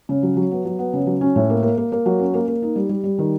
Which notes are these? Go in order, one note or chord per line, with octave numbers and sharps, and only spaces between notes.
C#3
F#3
F#3
B3
F#3
B3
C#3
F#3
C#4
A2
A#3
A#3
A#3
A#3
F#3
C#4
A#3
A#3
D#4
G3
G3
G3
D#3